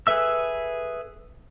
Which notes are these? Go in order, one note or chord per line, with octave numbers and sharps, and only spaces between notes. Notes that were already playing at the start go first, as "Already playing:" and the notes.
G#4 A4 B4 E5 E6